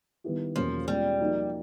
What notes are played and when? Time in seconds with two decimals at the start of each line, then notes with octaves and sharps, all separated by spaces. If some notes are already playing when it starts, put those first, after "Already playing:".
0.24 D#3 G3 B3 E4 G4
0.55 E2 B2 F3 F#3 A#3 C#4
0.88 B2 G3 G#3 C#4 F4
1.20 F3 A#3 D#4 F#4